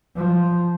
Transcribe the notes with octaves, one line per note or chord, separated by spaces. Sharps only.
F3